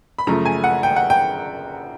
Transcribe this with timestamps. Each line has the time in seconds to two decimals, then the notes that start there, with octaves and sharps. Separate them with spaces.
0.18 B5
0.27 F#2 C#3 F3 A3 A#5
0.45 G#5
0.64 F#5
0.83 G5
0.96 F#5
1.10 G5